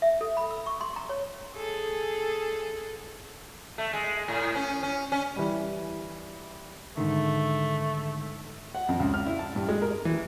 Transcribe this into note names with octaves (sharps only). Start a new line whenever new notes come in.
E5
A4
B5
E6
C#6
C6
A#5
C#5
G#4 A4
A3
G#3
A2
C#4
C#4
C#4
E3 G3
G#2 D3 D#3 A3
F#5
F2
C#2
F6
E4
A5
G2
G#3
A#4
E3